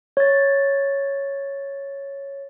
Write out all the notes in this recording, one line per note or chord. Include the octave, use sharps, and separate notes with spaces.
C#5 A6